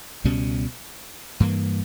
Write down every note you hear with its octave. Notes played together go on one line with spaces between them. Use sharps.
C#2 B2 G3 C#4
G2 E3 A#3